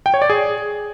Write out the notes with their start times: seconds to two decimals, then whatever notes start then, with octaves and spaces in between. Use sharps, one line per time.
0.06 G5
0.14 C#5
0.22 D5
0.30 G#4